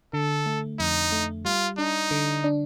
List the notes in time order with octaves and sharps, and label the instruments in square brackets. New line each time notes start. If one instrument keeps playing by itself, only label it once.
[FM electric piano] D3 [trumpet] A4
[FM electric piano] A3
[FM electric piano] F2 [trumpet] D#4
[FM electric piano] A3
[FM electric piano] G3 [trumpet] F4
[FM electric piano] D4 [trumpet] D#4
[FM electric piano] D3
D4